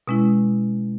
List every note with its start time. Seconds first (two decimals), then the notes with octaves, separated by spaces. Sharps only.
0.07 B2 G#3 C#4 E4